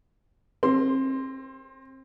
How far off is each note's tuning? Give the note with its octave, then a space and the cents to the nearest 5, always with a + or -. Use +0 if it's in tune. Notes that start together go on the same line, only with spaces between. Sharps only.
C4 +30 C6 +0